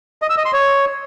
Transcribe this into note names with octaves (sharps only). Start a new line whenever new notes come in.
D#5
E6
D#5
C6
C#5